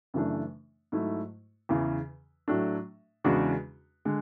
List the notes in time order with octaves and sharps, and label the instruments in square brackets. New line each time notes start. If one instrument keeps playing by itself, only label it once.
[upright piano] F#2 C#3 E3 A3 D4
G#2 F#3 A3 E4
E2 C#3 E3
A2 F#3 A3 D4
E2 C#3 G#3 D4 F#4
D3 G#3